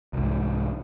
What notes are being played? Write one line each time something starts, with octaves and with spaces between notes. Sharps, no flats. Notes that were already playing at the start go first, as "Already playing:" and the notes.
C2 G#2